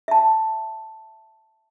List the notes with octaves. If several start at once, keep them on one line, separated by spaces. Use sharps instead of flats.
E5 A5